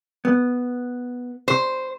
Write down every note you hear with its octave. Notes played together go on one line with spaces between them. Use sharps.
B3
C5